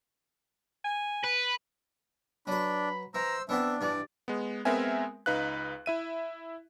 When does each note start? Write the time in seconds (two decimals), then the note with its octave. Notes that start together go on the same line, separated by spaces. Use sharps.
0.85 G#5
1.24 B4
2.47 F#3 D4 B4 B5
3.15 E3 C5 A#5 E6
3.49 E3 B3 C4 D4 E5
3.81 G2 E3 D5
4.28 G#3 B3
4.65 G#3 B3 C4 A#4 E5 G#5
5.26 C#2 D#4 B4 F5 F#6
5.86 E4 E5 D#7